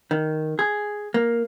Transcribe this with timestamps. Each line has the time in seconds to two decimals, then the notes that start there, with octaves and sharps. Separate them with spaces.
0.11 D#3
0.59 G#4
1.14 A#3